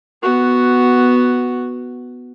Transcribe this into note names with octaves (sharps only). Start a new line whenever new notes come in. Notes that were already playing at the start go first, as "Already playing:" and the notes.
B3 F#4